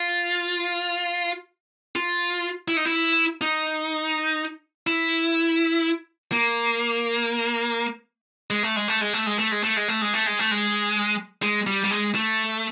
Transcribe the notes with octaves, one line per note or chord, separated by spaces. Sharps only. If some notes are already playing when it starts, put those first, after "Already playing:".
Already playing: F4
F4
E4
D#4
E4
D#4
E4
A#3
G#3
A3
G#3
A3
G#3
A3
G#3
A3
G#3
A3
G#3
A3
G#3
A3
G#3
A3
G#3
G#3
G3
G3
G#3
A3